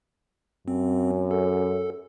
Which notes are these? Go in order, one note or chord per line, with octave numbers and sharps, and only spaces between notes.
F#2 C4
A4